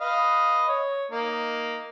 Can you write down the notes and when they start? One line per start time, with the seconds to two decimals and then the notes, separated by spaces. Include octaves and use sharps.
0.01 B4 D#5 F5
0.68 C#5
1.11 A#3 D#4